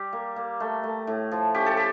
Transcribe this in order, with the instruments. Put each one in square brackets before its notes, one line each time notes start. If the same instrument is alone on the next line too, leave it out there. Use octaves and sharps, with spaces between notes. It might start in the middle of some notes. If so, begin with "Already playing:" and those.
Already playing: [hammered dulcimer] G3 G4
A#3
A#3
A3
A3
A2
F3
C#4 G4
A4
G4